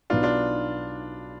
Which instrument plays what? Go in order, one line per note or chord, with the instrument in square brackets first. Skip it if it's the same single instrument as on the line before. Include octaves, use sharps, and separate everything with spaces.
[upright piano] B1 B2 B3 D#4 [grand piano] D4 F4
[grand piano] D4 F4